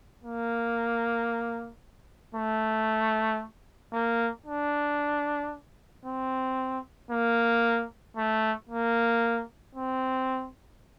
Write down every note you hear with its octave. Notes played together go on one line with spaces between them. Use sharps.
A#3
A3
A#3
D4
C4
A#3
A3
A#3
C4